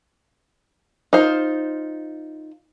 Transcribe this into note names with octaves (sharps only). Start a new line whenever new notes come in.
D#4 F4 C5